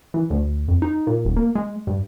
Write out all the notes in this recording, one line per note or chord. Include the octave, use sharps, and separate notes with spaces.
E3
D2
F2
D#4
A#2
D#1
A#3
G#3
G2